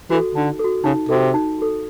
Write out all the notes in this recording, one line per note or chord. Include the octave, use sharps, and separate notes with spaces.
E3 F#4 A4
D3 D#4
F#4 A4
C#3 D#4
C3 F#4 A4
D#4
F#4 A4